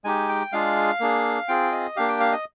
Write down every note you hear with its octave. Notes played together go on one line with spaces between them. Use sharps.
G#3 D#4 G4 G#5
G5
G#3 D4 F4 G#4 F5
A#3 D4 G#4
C4 F4 G#4 G5
D#5
A#3 D4 G4 F5
G5
F5
D#5